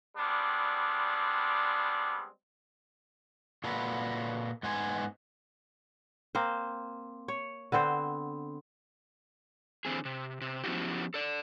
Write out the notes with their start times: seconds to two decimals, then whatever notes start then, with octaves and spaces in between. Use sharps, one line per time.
0.17 G3 G#3 B3 C4 D4
3.64 A#2 F4 F#4 A4 B4
4.63 G#2 B3 C5 G#5
6.35 A#3 C4 C5
7.28 C#5
7.72 D3 B3 C4 C5
9.85 D3 E3 C4 G#4
10.05 C3
10.41 C3
10.64 F3 B3 C#4 E4 F#4 G4
11.14 A4 D5